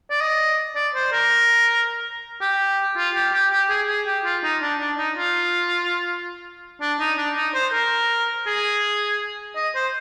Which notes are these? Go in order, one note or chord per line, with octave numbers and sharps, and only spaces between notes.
D5
D#5
D5
C5
A#4
G4
F4
G4
G4
G4
G#4
G#4
G4
F4
D#4
D4
D4
D#4
F4
D4
D#4
D4
D#4
C5
A#4
G#4
D#5
C5